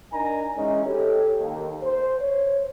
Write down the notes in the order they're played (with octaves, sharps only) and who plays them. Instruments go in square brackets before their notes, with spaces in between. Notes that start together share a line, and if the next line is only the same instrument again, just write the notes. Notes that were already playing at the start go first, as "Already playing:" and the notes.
[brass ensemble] D4 D#4 A#4 D#5 G#5 A#5
E3 G#3 C#4 D#4
G4 A4 C#5
D#2
C5
C#5